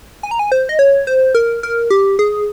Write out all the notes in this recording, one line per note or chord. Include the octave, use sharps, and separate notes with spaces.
G#5
A#5
G#5
C5
D#5
C#5
C5
A#4
A#4
G4
G#4